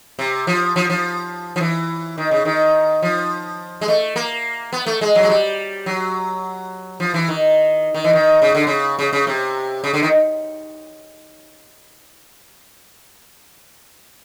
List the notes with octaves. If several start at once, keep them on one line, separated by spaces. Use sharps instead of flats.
C3
F3
F3
F3
F3
E3
D#3
C#3
D#3
F3
G#3
A3
A#3
B3
A3
G#3
F#3
G#3
G3
F#3
F3
E3
D#3
D#3
E3
D#3
C#3
D3
C#3
C#3
C#3
C3
C#3
D3
D#3